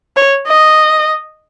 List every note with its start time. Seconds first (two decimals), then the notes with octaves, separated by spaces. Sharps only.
0.16 C#5
0.48 D#5